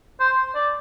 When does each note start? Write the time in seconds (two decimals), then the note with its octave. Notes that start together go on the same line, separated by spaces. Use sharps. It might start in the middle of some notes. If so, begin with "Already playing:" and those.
0.20 C5
0.55 D5